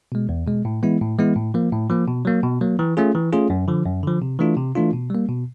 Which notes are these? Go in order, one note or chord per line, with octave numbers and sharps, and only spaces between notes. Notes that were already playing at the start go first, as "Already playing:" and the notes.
B2 G#3
E2
B2 G#3
A2
E3 G#3 B3 E4
A2
E3 G#3 B3 E4
A2
F3 A#3
A2
F3 A#3
B2
F#3 A#3
B2
F#3 A#3
E3
A3 C#4 F4 G#4
E3
A3 C#4 F4 G#4
F#2
D3 F3
F#2
D3 F3
C3
E3 A3 D4 F4
C3
E3 A3 D4 F4
B2
G3 A#3
B2